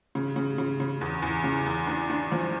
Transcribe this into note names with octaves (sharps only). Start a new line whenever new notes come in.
C#3
C#3
C#3
C#3
E2
E2
C#3
E2
D4
D4
F3